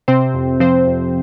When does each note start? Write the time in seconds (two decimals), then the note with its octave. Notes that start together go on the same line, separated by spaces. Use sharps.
0.08 C3 C4 C5
0.34 F2
0.60 F3 C4 C5
0.87 F2